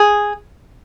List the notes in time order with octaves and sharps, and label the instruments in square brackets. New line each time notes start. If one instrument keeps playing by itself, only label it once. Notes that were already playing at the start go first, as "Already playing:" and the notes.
Already playing: [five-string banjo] G#4